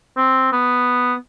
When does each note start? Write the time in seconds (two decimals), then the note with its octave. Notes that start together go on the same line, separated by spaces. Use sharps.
0.17 C4
0.52 B3